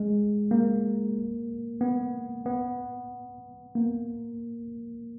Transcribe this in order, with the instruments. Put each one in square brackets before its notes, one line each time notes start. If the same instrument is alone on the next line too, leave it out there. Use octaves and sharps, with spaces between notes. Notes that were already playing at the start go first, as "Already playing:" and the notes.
Already playing: [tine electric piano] G#3
A#3
B3
B3
A#3